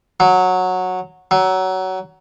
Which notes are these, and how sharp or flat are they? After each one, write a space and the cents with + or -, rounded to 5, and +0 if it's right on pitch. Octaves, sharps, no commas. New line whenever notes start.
F#3 -10
F#3 +20